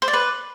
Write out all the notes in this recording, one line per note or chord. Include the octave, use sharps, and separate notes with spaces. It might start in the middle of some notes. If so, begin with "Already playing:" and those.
C5
D5
B4